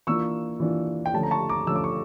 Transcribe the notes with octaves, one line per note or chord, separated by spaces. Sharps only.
E3 A#3 D4 F4 C#6 E6
E3 A#3 D4 F4
G5
D3 F3 A3 C#4 A5
A#5
A5 C#6
A#5 D6
D3 F3 A3 C#4 E6
D6
C#6